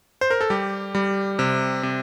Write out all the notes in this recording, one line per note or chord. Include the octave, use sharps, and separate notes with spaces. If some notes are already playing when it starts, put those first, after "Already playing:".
C5
A#4
A4
G3 G4
G3
C3
C3